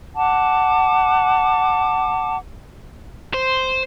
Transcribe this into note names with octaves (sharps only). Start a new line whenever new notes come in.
F#5 A5 D6
C5